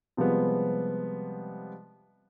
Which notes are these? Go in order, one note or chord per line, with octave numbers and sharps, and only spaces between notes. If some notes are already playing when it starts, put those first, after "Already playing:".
C3 F3 G3 G#3 B3